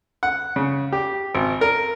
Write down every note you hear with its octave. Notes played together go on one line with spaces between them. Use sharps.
F#5
C#3
G4
G#1
A#4